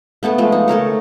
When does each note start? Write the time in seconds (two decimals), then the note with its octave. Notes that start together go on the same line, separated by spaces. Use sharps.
0.23 A3 B3 A4 A5
0.38 F3 G#3 A3
0.52 D#4
0.68 A3 A4 A#4 C#5